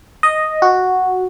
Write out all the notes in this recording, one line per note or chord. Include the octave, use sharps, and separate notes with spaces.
D#5
F#4